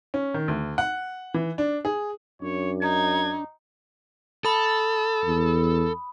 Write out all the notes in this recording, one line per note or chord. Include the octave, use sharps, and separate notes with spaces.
C#4
D#3
D2
F#5
E3
D4
G#4
F#2 D4 C#5
D#4 G#6
A4 B5 D#6
E2